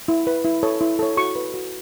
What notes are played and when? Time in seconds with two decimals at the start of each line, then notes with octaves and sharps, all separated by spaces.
0.08 E4
0.27 B4
0.45 E4
0.63 A4 C#5
0.81 E4
0.99 A4 C#5
1.17 F#4 C#6
1.35 B4
1.54 F#4